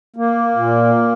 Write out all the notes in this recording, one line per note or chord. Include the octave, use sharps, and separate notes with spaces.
A#3
A#2